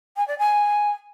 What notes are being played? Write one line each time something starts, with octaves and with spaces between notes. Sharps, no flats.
G#5
D5
G#5